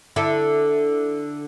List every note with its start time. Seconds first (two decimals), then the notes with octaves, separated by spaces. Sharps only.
0.16 D3 E4 A4